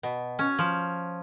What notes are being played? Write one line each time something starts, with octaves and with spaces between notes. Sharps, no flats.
B2
C#4
F3